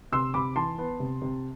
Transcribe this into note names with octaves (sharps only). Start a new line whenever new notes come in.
C3 C6 E6
C3 B5 D6
E3 A5 C6
B3
C3
C3